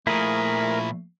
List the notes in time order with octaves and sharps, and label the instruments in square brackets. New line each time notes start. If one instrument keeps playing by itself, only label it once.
[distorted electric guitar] A#2 F3 [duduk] A3 [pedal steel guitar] E4 G#4 [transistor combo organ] A#4